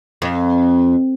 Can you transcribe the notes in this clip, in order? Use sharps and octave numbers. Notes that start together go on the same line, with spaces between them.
F2